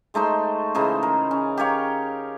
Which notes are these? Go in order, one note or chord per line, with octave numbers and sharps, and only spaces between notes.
G#3 A3 D#4 C5
C#3 E3 D#4 C5
A#4
C#4
G4 A#4 C#5 F5